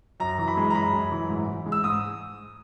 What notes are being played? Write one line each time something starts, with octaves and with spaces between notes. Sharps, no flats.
F#2 A#5
E3
B5
G#3
A#5
F#2 B5
F#2
E3
G#2
E3
G#3
E6
G#2 D#6